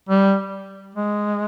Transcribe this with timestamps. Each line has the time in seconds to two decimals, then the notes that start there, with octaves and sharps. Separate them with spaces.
0.09 G3
0.95 G#3